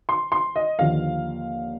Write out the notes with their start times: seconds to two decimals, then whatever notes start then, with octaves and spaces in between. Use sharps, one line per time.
0.09 C6
0.32 C6
0.56 D#5
0.79 D#2 D3 F3 F5